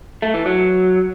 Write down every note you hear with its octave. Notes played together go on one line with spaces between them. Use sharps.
A3
E3
F#3